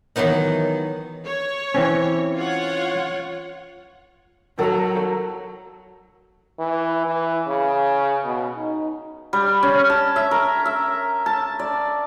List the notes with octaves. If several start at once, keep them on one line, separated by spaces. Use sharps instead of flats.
D#3 E3 F#3 B3 D#4
C#5
E3 C4 C#4
F4 C#5 F#5
F#3 A4 A#4 F#5 A#5
E3
E3
C#3
B2
D#4
G3
C#4
A5
E5
A#4
E5
A5
D5